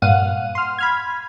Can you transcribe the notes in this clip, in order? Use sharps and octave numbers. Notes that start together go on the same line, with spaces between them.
G2 A#2 F5 F#5 D#7
C6 F6
B5 F6 G#6